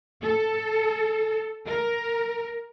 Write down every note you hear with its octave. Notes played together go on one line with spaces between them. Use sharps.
A4
A#4